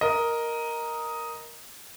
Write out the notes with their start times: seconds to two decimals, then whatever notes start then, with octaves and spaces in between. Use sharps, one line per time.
0.01 A#4 D#5